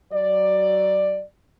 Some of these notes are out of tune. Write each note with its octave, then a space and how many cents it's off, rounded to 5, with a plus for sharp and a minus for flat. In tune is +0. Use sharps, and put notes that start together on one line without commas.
F#3 +25 D5 +10